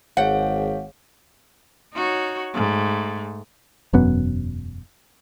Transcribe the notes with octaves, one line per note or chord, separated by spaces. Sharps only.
G#1 G#4 C#5 F5 F#5
D#4 F#4 C#5
G#2 A3
E1 F#2 B3